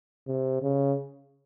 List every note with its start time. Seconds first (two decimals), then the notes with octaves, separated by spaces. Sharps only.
0.27 C3
0.62 C#3